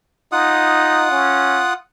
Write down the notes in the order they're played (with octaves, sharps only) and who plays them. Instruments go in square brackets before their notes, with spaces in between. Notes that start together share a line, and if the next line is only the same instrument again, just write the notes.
[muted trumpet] D#4 [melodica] F4 F#5 D#6
[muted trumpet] C#4